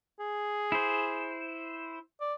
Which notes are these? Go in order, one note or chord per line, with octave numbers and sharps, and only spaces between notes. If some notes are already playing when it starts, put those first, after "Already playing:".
G#4
E4 C5
D5